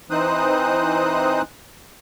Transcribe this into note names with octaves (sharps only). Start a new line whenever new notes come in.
E3 C4 D#4 C5 D#6 F#6